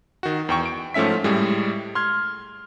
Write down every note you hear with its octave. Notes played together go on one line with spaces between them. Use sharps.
D#3 F#4
E2 G5 C#6
D7
G#2 F3 A3 C#4 E5 B6
A2 G3 G#3
C6 F6 G#6